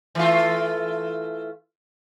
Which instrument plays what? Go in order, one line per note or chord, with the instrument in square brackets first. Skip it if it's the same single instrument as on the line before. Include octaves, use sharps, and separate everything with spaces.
[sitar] E3 A3 F4